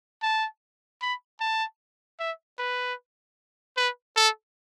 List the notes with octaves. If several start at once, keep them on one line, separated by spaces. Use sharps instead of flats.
A5
B5
A5
E5
B4
B4
A4